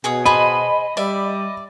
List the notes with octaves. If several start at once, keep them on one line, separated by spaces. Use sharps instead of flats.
B2 G#4 C#5 D#6
G#4 C5 D#5 A5 B5
G3 D5 E5